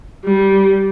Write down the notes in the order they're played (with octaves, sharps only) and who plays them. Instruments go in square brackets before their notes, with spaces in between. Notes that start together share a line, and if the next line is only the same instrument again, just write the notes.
[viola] G3